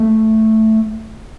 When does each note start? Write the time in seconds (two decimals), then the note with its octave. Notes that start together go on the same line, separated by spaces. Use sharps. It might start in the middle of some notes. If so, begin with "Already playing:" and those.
Already playing: A3